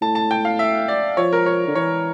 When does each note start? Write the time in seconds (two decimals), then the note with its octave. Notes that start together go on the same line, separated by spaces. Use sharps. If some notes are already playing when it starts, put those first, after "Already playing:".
0.02 A2 A5
0.15 A5
0.31 G5
0.45 F5
0.59 E5
0.88 D5
1.17 F3 C#5
1.33 A#4
1.46 C#5
1.68 D3
1.75 E3 C#5